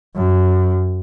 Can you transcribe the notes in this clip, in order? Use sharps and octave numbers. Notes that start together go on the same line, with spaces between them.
F#2